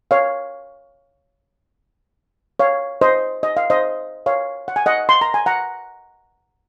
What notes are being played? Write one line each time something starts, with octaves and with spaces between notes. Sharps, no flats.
C#5 F5
C#5 F5
C5 D#5
D#5
F5
C5 D#5
C#5 F5
F#5
G#5
D#5 F#5
C6
A#5
G#5
F#5 A#5